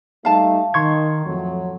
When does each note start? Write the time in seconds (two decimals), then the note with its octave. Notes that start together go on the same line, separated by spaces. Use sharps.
0.25 G3 A3 D#4 F5 A5
0.74 D#3 C6 C#6 G#6
1.26 F2 A2 F#3